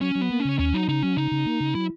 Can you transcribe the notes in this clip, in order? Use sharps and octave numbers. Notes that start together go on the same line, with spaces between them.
F#3 C#4
F#3
B3
A#3
C#4
C#3
D#2 C#4
F#3 D#4
C#3 D#4
F#3 C#4
C#3 D#4
C#3
A#3
C#3
F#3 E4